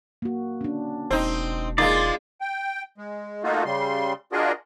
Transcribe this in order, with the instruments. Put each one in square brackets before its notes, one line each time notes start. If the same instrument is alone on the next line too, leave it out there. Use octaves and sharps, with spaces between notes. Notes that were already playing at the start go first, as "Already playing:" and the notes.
[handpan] A#3 F#4
C#4 D4
[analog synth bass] E1 [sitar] C4 D#4
[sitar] G#3 A#3 D#4 [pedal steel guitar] F4 D5
[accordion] G5
G#3
A3 A#3 D#4 F4 F#4
C#3 G3 C6
D4 F4 F#4 G#4 A#4 D#5